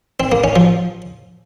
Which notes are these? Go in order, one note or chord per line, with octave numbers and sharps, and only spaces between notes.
C4
A#3
C#4
F3